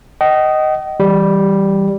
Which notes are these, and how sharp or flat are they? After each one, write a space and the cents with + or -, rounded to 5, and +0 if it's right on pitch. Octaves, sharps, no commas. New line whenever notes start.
D#5 +0 G5 -45
E3 +0 G3 +0